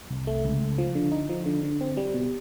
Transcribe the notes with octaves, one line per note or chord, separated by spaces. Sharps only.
C2
A3
C#2
C#2
F3
D3
D#4
F3
D3
D3
C4
G3
B2